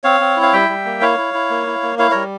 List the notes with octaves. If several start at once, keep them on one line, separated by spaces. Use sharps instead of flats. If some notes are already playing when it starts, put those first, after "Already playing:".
C4 C#5 F5
C4
E4
F5
G3 E5 G5
G3
A#3
E4 C#5 F5
E4
E4
A#3
E4
A#3
E4 C#5 F5
G3 A#4 C#5